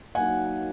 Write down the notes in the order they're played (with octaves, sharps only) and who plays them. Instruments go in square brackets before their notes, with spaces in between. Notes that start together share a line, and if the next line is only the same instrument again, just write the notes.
[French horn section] F#3 A#3 D#4 [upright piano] F#5 G#5